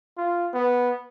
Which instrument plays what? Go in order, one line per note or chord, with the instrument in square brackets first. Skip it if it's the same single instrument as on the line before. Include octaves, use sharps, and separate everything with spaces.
[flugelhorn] F4
B3